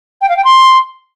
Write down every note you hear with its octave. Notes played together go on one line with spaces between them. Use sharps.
G5
F5
G5
C6